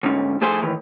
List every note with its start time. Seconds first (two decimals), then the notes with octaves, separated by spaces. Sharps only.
0.03 D2 G#2 C#4
0.41 F2 A3 G#4 C5 G#5 C6
0.62 A2 D#3 E3